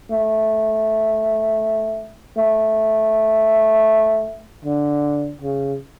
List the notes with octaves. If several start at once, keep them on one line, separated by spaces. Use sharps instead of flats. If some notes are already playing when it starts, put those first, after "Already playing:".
A3
A3
D3
C#3